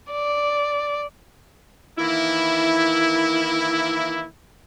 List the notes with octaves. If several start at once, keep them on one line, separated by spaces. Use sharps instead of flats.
D5
D#3 E3 A#3 E4